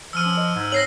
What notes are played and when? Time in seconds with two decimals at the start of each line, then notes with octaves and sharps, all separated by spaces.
0.13 F3 E6 F6 D#7
0.25 C#4
0.37 D#5
0.55 G#2
0.72 G3 C4 C#5 A#6 C7 F#7